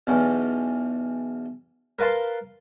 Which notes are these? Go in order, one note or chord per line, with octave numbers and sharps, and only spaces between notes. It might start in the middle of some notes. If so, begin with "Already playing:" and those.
B1 E2
A#4 B4 F5 A5 C6